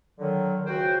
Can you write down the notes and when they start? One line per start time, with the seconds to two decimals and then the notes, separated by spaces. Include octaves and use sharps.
0.19 D3 D#3 F#3
0.66 C#2 F#4 C5 G5